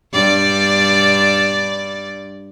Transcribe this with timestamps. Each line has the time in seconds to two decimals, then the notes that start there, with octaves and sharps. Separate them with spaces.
0.13 G2 D5